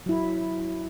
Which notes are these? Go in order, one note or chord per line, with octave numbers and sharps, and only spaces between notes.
F#3 E4